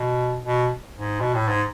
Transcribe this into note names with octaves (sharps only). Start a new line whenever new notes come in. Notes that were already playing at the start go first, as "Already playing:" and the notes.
Already playing: B2
B2
G#2
B2
A2
G#2